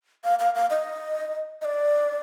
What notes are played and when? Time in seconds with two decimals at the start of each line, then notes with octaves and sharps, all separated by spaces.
0.24 F5
0.39 F5
0.55 F5
0.70 D#5
1.62 D#5
1.65 D5